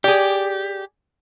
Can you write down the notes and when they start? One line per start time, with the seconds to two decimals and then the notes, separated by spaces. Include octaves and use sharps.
0.04 G4 G#4 D5